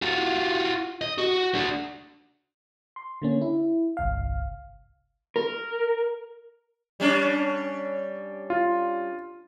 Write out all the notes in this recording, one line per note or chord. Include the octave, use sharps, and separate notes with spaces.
F4 F#4
D#5
F#4
D4 F#4
C6
D3 A#3 C#4
E4
G1 C2 F5
A#4
G3 C#4 D4
F4